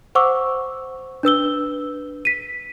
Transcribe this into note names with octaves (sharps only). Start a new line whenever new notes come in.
C5 F#5 C#6 D6 E6
D4 B4 E6 G7
B6 D#7